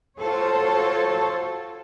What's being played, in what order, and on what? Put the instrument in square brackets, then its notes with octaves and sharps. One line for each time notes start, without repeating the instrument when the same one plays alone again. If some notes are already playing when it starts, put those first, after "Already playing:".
[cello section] F4 F#4 A4 C5 C#5